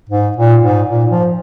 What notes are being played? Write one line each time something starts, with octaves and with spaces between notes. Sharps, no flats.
G#2
A#2
G#2
A#2
F3